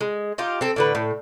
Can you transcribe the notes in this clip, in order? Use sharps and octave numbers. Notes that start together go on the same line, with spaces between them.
G#3
D#4 F4 G4
C4 A4
A2 D3 B4
A2